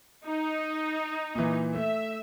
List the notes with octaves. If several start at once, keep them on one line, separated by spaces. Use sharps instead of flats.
D#4
A#2 E3
A3 E5